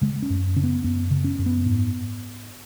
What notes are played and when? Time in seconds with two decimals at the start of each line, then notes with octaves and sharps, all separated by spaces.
0.01 C#3 G#3
0.22 C#4
0.30 F#2
0.56 C#3 C#4
0.64 B3
0.84 F#2 B3
1.11 C#3
1.24 C#4
1.39 F#2
1.46 B3
1.66 G#2